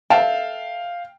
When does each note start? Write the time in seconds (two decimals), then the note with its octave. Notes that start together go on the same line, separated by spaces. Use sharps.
0.10 A4 B4 E5 F5 G5 A5